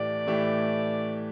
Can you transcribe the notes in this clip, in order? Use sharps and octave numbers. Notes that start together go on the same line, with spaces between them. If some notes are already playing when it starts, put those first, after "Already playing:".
Already playing: A2 E3 A3 E4 G4 D5
A2 E3 A3 E4 G4